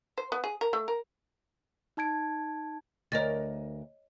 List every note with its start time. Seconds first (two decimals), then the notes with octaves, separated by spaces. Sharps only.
0.18 C5
0.32 B3
0.44 G#4
0.61 A#4
0.73 A3
0.88 A#4
1.97 D#4 A5 G#6 D7
3.12 D2 A#4 C#5 D#5 A6